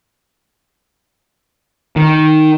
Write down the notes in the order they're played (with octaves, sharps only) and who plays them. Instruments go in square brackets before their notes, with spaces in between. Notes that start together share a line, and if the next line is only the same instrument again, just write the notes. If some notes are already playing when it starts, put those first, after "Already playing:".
[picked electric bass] D#3